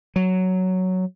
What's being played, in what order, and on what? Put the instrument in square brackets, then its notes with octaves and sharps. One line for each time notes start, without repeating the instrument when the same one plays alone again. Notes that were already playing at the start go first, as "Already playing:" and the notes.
[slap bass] F#3